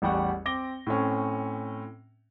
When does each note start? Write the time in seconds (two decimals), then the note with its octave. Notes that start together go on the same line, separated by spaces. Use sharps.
0.02 A1 E2 G3 G4 F#5 C#6
0.45 C4 D6 A#6 G7
0.87 A2 C4 C#4